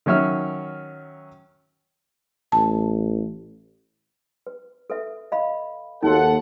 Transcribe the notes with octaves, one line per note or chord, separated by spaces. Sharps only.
D#3 F#3 C#4 E5 F6
A1 A5
B4
A4 B4 E5
D#5 F5 B5
D#2 D#4 F#4 A4 F#5